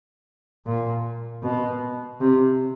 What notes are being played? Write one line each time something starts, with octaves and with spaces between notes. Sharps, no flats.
A#2
B2
C3